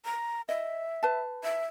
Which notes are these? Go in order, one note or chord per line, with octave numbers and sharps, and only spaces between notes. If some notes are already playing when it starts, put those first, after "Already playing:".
A#5
D#5 E5
B4 A5
E5